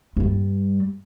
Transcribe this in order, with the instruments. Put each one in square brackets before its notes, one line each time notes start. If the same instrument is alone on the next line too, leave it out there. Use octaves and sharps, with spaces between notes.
[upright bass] G2 G3